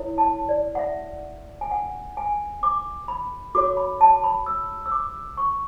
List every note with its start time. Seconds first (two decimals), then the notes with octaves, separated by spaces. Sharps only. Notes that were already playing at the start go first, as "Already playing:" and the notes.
Already playing: E4 A4 C#5
0.18 A5
0.49 D5
0.75 F#5
0.79 E5
1.61 G#5
1.71 F#5
2.17 G#5
2.63 D6
3.08 B5
3.55 F#4 A4 C#5 D6
3.77 B5
4.01 A5
4.24 B5
4.46 E6
4.86 E6
4.92 D6
5.37 C#6